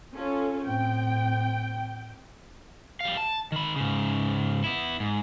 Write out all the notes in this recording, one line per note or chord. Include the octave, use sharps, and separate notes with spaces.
C#4 F4 A4
A2 C4 G5
G3 F5
A5
D#3 B5
G#2 C#3
B3 E4
G#2